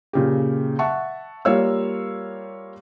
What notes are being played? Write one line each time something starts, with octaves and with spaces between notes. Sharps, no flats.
A#2 C#3 G4
E5 F#5 A5 C#6
G3 A#3 F4 C#5 F5 E6